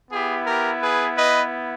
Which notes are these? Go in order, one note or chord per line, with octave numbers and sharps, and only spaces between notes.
B3 E4 G4 G#4
G4 A#4
G#4 B4
B4 D#5